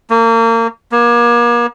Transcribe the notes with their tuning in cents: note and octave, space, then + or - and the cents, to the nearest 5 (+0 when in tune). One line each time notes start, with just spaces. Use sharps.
A#3 -30
A#3 +35